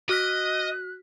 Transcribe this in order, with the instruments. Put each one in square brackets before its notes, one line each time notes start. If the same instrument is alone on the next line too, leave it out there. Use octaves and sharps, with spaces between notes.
[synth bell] F#4 F6 B6 [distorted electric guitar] D#5 [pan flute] F#6